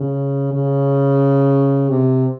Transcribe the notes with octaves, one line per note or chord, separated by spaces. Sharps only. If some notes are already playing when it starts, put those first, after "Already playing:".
Already playing: C#3
C#3
C3